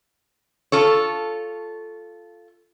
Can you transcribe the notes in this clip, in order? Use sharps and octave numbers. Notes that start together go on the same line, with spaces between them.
F4 A4 C#5